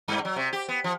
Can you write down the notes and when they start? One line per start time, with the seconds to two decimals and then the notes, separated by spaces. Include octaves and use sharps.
0.08 G2
0.25 F#3
0.36 C3
0.53 G4
0.69 B3
0.84 F3